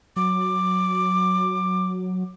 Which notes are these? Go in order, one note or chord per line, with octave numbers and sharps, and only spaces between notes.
F#3 D6